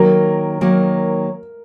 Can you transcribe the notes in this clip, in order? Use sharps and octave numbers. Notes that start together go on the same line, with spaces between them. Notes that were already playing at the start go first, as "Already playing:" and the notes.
Already playing: D#3 F#3 A#3 A#4
D#3 F#3 A#3